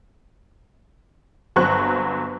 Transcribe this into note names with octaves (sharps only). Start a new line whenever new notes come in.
G1 F#3 C4 C#6 F#6